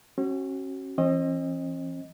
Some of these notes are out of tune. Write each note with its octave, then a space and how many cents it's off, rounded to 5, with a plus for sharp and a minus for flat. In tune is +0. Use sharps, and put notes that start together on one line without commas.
C#4 -35 F#4 +20
E3 +25 C4 +40 D#5 +0